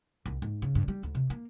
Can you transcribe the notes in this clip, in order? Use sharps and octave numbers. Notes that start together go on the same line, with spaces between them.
C2
G#2
C#3
G2
G3
D2
C3
A#3